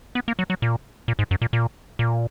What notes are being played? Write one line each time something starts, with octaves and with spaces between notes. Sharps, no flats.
B3
A#3
F#3
F#3
A#2
A#2
G#2
F#2
A#2
A#2
A#2